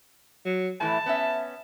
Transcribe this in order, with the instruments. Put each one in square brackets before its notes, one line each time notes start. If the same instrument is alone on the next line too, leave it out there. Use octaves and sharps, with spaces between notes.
[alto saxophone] F#3
[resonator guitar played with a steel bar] A2 E3 A3 [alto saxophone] A5
[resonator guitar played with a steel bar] B3 C#4 E5